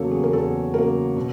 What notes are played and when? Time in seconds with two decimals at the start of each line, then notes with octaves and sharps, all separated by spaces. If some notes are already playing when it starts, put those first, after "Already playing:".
Already playing: E2 C#3 F#3 A#3 A4 C#5
0.11 G#4
0.24 A#4
0.32 E2 A4
0.74 C#3 F#3 A#3 A#4
1.16 B2